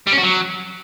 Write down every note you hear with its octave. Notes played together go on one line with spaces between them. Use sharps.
G3
C#4
F#4
F#3